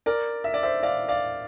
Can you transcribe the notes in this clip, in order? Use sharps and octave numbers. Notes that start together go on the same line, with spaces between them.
A#4 D5
E5
D5
C5 E5
D5 F5
D5 F5